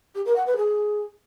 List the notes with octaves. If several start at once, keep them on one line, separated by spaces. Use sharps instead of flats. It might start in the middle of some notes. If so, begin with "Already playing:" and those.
G4
A#4
F#5
B4
G#4